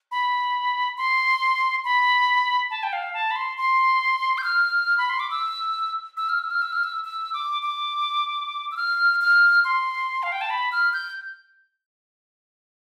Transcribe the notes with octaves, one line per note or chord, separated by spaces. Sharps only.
B5
C6
B5
A5
G5
F5
A5
B5
C6
C6
G6
F6
B5
C6
D6
E6
E6
F6
E6
F6
E6
F6
E6
E6
D6
D6
E6
F6
F6
C6
F5
G5
A5
B5
F6
G6